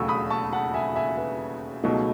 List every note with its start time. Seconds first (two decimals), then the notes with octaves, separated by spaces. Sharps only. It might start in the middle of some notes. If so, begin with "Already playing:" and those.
Already playing: E1 D#2 C#3 F#3 A3 C#6 E6
0.08 B5 D#6
0.30 A5 C#6
0.53 F#5 A5
0.74 E5 G#5
0.96 E5 G#5
1.18 B4
1.84 C#2 B2 F#3 A3 D#4